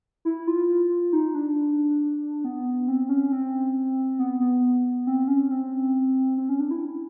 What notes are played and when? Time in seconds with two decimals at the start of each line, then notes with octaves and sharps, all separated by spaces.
0.25 E4
0.47 F4
1.13 D#4
1.34 D4
2.44 B3
2.88 C4
3.09 C#4
3.32 C4
4.19 B3
4.40 B3
5.07 C4
5.28 C#4
5.50 C4
6.38 C4
6.49 C#4
6.59 D4
6.71 E4